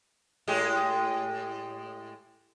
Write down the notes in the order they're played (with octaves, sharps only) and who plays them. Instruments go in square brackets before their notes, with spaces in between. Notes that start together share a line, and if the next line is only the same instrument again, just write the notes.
[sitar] A2 G#3 G4